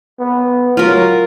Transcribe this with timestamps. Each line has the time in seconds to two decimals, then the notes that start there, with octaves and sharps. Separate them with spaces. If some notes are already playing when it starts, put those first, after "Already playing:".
0.20 B3
0.77 F#3 F4 A#4